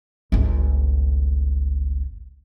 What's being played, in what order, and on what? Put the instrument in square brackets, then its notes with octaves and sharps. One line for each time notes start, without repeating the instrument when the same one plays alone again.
[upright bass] G1 C#2